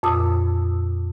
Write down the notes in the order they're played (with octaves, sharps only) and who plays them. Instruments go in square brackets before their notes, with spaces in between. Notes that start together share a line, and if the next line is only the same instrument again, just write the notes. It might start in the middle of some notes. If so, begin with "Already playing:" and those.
[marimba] F2 A#2 D#6 E6